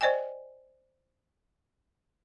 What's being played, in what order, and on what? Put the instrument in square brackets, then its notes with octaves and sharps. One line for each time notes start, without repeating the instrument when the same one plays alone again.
[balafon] C5 D5 D#5 G5 G#5